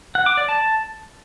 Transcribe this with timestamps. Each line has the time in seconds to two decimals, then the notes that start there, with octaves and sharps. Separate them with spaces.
0.15 F#5
0.26 D6
0.37 D5
0.49 A5